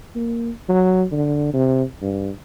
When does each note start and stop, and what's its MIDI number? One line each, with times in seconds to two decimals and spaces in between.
0.16 0.51 58
0.69 1.05 54
1.12 1.52 50
1.54 1.83 48
2.01 2.30 43